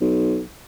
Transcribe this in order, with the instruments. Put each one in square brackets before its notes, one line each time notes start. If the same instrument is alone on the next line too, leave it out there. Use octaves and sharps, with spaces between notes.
[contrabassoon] B1